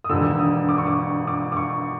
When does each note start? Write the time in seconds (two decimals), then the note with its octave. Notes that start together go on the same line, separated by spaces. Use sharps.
0.04 D#6
0.09 E1 D#2 D3 E6
0.39 D#6
0.69 D6
0.78 C#6
0.87 D6
1.28 D6
1.52 D6
1.57 C#6